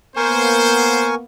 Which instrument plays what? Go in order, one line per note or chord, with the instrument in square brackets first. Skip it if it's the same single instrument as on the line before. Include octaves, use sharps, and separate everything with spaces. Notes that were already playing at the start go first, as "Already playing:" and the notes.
[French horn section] A#3 B3 [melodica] A#4 G#5 C#6 [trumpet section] C5